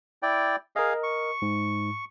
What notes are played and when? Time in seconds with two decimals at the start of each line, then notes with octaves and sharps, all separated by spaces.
0.23 E4 D5 G5
0.76 G#4 A#4 D#5 F5
1.03 C#6
1.42 G#2